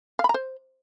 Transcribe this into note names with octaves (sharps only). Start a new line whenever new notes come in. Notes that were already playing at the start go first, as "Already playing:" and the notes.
F5
B5
A#5
C5